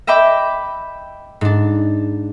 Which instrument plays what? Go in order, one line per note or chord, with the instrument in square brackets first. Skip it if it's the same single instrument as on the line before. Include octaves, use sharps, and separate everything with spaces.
[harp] D#5 E5 G5 B5 D6
G#2 D4